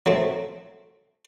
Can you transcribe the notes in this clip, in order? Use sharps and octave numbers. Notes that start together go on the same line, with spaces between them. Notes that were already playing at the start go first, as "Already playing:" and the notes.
F#3 A3 C4